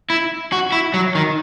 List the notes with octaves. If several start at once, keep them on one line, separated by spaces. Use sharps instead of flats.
E4
F#4
E4
F#3
D#3